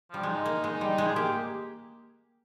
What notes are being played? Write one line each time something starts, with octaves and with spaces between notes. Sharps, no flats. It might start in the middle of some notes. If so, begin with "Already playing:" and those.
F3 G3
G#3 D#4
A#3
G#3
G3
G#3
G#4
A#3 G4